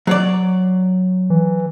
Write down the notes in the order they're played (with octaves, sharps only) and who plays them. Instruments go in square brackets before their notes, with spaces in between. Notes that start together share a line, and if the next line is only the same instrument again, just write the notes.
[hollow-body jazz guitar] F#3 C#5 D5
[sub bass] E3